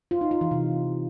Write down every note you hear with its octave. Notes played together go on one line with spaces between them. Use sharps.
F4
D#4
F4
E3
C3